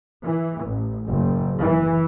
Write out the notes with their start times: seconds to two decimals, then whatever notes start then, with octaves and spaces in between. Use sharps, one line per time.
0.24 E3
0.65 A1
1.08 F#1
1.62 E3